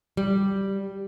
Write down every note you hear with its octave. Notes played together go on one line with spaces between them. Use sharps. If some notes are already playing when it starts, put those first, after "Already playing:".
G3